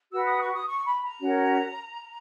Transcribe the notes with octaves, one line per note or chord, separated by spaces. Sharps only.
F#4 B4 E6
D#6
C#6
D#6
C#6
B5
A#5
C#4 F#4 A#4 C#5